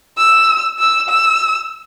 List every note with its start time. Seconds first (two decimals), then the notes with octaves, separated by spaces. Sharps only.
0.17 E6
0.79 E6
1.09 E6